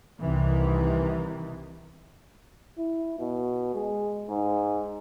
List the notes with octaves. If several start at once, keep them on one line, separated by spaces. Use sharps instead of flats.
C2 C3 D#3 E3
E4
B2
G#3
G#2